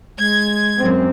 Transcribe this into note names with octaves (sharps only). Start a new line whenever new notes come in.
G#3 G#6
F#2 C4